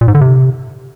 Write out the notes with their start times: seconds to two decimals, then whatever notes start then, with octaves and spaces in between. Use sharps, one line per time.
0.01 A#2
0.08 G#2
0.15 D3
0.21 C3